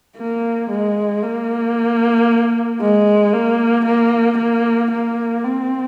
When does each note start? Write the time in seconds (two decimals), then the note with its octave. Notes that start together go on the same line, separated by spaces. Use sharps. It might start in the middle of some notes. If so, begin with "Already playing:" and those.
0.17 A#3
0.70 G#3
1.23 A#3
2.81 G#3
3.33 A#3
3.85 A#3
4.38 A#3
4.92 A#3
5.44 C4